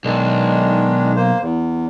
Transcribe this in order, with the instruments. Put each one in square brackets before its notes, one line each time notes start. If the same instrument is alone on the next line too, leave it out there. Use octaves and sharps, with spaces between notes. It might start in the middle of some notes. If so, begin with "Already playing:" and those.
[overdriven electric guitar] B1 [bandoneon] D#3 G#3 D4
[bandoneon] A#3 C5
E2